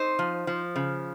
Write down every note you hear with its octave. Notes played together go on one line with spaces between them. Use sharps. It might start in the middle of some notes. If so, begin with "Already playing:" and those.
Already playing: C4 D#4 C5
F3
F3
C#3